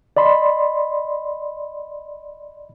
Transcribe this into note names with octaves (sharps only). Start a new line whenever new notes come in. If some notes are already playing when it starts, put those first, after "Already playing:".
D5 D#5 B5 C6